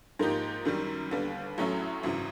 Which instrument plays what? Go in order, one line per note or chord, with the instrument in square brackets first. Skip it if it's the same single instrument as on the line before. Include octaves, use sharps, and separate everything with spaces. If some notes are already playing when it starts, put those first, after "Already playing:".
[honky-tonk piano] G#2 F3 A#3 D#4 G4
F#2 D#3 G3
D#2 D3 G3 B3
A1 A2 F#3 A3 C#4
G#1 F#2 C#3 E3